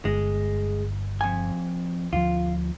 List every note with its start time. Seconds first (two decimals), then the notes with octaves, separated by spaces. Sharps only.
0.05 G1 G#3
1.21 F2 G#5
2.13 D2 F3 F4